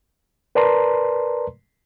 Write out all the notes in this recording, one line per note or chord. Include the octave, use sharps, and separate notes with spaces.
A#4 B4 D5 A5 A#5 C6